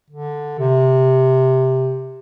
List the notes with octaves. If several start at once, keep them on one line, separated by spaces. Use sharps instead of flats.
D3
C3